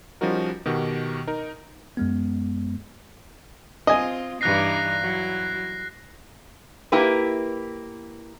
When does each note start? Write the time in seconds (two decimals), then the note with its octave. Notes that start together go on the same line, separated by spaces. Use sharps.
0.21 F3 G3 C#4 D#4 F#4 A#4
0.65 B2 D#3 F#4 G4
1.27 D#4 A#4
1.97 F#2 G#3 B3
3.87 C4 F4 D#5 G#5
4.41 G2 E3 D#4 F#6 A#6 C7
5.01 F#3 E4
6.92 A#3 E4 G4 B4